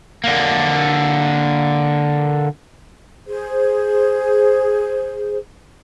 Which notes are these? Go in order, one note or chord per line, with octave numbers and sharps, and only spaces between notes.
D3 A#3
G#4 C5